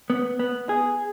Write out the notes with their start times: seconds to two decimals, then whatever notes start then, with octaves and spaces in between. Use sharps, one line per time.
0.10 B3
0.39 B3
0.69 G#4